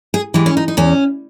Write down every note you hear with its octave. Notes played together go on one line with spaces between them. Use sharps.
G#4
E3 G#3 G4
C#4
D#4
D#4
E2 C#4